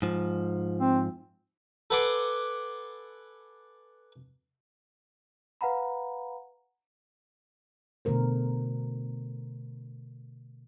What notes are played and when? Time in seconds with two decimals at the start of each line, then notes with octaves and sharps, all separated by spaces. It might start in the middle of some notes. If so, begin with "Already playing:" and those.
0.02 G#2 F3
0.80 C4
1.90 A4 B4 F#5 G#5 C6 D6
5.61 B4 F5 F#5 A#5 B5
8.05 B2 D3 A3 A#4 C5